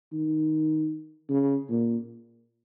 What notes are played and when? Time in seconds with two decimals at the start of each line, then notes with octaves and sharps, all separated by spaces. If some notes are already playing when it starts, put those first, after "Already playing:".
0.12 D#3
1.29 C#3
1.70 A#2